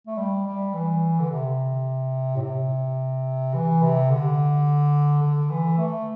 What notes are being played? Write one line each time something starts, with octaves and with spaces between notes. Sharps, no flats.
A3
G3
G3
E3
D3
C3
A2
C3
E3
C3
D3
D3
E3
A3